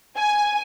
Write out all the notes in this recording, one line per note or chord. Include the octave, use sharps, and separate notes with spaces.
G#5